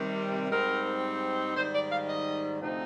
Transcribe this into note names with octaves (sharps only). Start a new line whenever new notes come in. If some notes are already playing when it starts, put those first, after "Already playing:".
Already playing: C3 D#3 G3
G#2 G3 C4 D#4 A#4
G#2 D#3 G3 C5
D5
F5
D#5
D2 C3 F3 C4 D#4